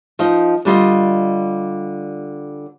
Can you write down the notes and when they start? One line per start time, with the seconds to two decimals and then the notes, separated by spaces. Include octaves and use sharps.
0.19 F3 D#4 D#5
0.65 D3 G3 F4 D#5